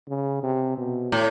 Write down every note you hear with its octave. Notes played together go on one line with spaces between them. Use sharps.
C#3
C3
B2
A2